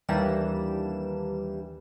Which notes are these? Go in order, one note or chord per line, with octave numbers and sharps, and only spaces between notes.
D#2 E3 G3 A#3 D4 E7